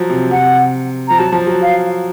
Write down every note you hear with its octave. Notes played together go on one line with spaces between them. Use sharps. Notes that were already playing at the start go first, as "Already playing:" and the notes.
Already playing: F3 F#3
C3
C3 F#5
F3 A#5
F#3 A5
F3
F#3
F5